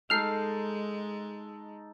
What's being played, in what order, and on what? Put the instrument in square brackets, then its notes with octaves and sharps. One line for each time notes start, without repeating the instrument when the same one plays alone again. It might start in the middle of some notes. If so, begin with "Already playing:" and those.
[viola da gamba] G#3 [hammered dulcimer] D#4 A4 [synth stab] F6 C7